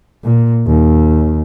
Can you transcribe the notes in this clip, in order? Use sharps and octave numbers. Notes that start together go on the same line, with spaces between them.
A#2
D#2